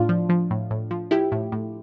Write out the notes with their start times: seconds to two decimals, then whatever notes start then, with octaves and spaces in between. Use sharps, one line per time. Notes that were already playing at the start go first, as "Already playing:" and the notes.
Already playing: A2 D4 F4
0.09 F3
0.29 F3
0.51 A2
0.71 A2
0.91 F3
1.11 F3 E4 G4
1.32 A2
1.52 A2